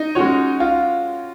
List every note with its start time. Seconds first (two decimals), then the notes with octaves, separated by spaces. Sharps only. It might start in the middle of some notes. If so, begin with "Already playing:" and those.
Already playing: D#4
0.15 G#3 C#4 F#4 C#5
0.60 F4